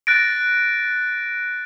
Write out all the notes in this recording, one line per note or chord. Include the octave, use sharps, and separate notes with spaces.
F#6 A6 A#6 D7